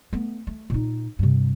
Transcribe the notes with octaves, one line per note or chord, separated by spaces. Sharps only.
A3 B3
A3
A#2 D#4
G2 C3